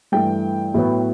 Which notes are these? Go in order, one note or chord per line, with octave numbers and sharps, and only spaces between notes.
G2 E3 A3 G5
A2 F#3 B3